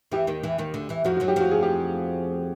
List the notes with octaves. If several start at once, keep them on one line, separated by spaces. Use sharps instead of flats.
E2 E3 G4
D#2 D#3
E2 E3
D#2 D#3
D2 D3
E2 E3
F2 F3 F#4
F#4
F#2 F#3
G4
F2 F3 F#4
G#4
G4